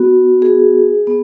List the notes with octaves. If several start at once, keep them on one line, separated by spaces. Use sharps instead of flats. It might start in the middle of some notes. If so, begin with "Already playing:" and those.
Already playing: B3 F#4
G#4
B3